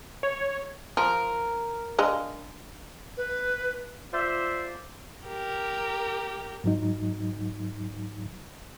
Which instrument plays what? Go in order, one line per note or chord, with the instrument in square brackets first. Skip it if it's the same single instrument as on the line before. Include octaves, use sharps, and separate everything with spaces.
[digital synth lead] C#5
[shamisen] F3 [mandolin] A#4
[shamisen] G#3 D4 F5
[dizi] B4
[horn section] F4 C5 D5 E5
[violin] G4 A#4
[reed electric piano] G#2 F#3 D#4